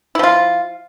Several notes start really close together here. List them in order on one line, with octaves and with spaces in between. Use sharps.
E4 F3 F4